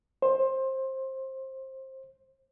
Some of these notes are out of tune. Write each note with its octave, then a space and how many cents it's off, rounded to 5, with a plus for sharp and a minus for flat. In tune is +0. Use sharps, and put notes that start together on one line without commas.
C5 +20